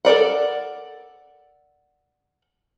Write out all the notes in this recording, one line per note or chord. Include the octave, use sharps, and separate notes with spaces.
A4 A#4 D5 F#5